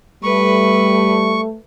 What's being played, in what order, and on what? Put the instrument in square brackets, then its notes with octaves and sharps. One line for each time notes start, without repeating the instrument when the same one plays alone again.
[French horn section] G3 [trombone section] A3 [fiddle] B4 [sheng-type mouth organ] C#6